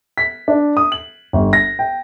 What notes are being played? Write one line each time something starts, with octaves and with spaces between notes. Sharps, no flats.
B6
D4
D#6
F#7
G1
A#6
G5